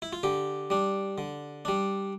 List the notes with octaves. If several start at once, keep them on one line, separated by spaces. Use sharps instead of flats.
E4
F4
D3 G4
G3 D4
D3
G3 D4